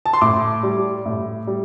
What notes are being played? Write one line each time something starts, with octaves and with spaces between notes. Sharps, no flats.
A5
C6
A2 D6
G3
A2
G3